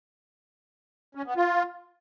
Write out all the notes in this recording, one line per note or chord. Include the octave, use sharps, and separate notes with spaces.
C#4
B3
F4